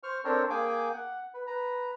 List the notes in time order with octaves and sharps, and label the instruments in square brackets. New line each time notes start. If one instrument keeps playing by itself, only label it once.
[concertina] C5 C#6 F6
C4 D4 A4 A#4 C5 C#5
A#3 G#4 G5 G#5 D6
F#5
B4
B4 A#5